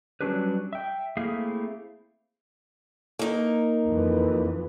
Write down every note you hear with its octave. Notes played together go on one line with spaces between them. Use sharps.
F#3 G3 C#4 D4 G4 B4
E5 G5
A3 A#3 C4 E4 G#4 F5
A#3 D#4
F2 E3